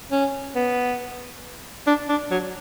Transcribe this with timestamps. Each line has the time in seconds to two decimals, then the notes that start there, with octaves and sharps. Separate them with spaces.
0.11 C#4
0.55 B3
1.87 D4
2.09 D4
2.31 F#3